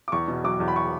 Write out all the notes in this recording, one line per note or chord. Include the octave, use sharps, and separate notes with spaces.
D6
E2 C#6
B2
F#3 D6
E2
B5
C#6